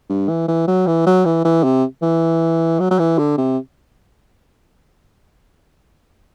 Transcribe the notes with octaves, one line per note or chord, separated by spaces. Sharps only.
G2
E3
E3
F#3
E3
F#3
E3
E3
C3
E3
F#3
F#3
E3
D3
C3